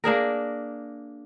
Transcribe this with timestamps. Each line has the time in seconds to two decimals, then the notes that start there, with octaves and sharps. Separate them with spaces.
0.04 A#3 D4 G#4 A#4